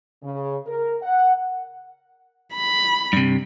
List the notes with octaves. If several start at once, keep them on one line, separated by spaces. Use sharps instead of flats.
C#3
A#4
F#5
B5
G2 C3